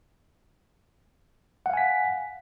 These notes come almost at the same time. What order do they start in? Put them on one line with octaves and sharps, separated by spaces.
F#5 F5 G#5 B6